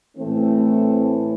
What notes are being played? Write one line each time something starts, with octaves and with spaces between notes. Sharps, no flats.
A2 E3 A3 C4